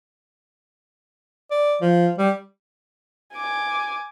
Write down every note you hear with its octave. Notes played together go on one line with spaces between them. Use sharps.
D5
F3
G3
G#5 D6